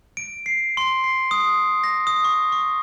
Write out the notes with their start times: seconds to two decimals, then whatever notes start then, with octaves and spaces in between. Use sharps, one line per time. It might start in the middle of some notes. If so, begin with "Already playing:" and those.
0.17 D7
0.46 C7
0.77 C6
1.04 C7
1.31 D#6
1.84 A#6
2.07 D#6
2.24 C#6
2.52 C#6